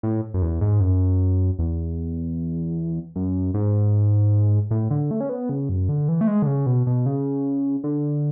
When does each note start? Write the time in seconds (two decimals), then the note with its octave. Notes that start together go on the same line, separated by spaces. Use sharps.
0.03 A2
0.34 F#2
0.42 E2
0.61 G#2
0.80 F#2
1.59 E2
3.16 F#2
3.54 G#2
4.71 A2
4.91 D3
5.11 A3
5.21 C#4
5.29 B3
5.49 C#3
5.69 F#2
5.89 D3
6.09 E3
6.21 A3
6.28 G#3
6.42 D3
6.46 C#3
6.66 B2
6.87 B2
7.06 C#3
7.84 D3